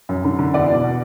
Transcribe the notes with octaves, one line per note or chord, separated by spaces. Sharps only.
F#2
D3
D3
E2 D5 F#5
B2
B2